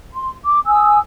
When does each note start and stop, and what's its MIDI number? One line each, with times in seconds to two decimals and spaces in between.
0.14 0.33 84
0.45 0.58 86
0.67 0.98 80
0.67 0.98 87
0.67 0.98 88